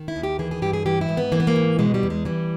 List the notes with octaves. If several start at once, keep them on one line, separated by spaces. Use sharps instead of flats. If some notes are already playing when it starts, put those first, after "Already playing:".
Already playing: D#3
E4
D#2
G4
E3 G#4
G#4
G2 G4
G#4
E3 G4
E4
G#2
B3
E3 A#3
B3
A#3
G#2
B2 G#3
G3
E2
G#3
E3 G3